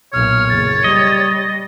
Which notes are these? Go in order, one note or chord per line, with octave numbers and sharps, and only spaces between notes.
B1 A#2 C#5 F6
F#1 A6
G3 D#5